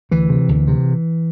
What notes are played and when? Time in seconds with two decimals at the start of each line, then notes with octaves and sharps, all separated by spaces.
0.11 D2 E3
0.29 C3
0.49 D2
0.67 C3